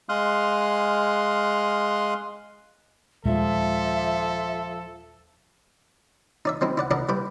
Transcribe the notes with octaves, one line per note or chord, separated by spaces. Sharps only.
G#3 F5 C6 D#6 F6 F#6
D#2 A#2 F3 G#3 A4 E5
D#4 D5 E5
G#3 C4 D#4 E4
E4 D5 F#5
D4 E4 A#4 D5 D#5 F#5
G3 E4 B4 D6